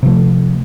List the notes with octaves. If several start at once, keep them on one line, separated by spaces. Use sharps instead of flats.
C3 F3 A3